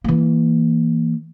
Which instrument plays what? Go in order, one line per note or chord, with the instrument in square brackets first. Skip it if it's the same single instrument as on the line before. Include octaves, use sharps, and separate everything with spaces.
[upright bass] E3 A#3